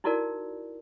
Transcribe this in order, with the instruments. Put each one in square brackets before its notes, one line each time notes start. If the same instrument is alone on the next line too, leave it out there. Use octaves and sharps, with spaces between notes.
[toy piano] D#4 E4 F#4 A4 A#4 D5